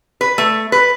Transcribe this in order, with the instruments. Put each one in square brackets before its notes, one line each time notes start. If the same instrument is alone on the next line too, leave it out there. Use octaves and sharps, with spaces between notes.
[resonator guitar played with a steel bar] B4
A3
B4